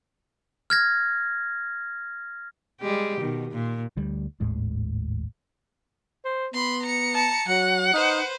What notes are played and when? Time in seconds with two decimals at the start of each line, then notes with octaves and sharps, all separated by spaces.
0.70 F6 G#6 A#6
2.81 G3 G#3 G4
3.21 B2 D#3
3.51 A#2
3.97 D2 G3
4.40 G#1 D#2 A2 G#3
6.25 C5
6.54 B3 B5 C6
6.83 A#5 C#7
7.14 A5
7.48 F#3 F#5
7.93 D#4 B4 C5